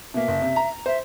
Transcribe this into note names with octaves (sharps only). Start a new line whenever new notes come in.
B2 A#3 E5
F#1
C3
A#5
C5 E5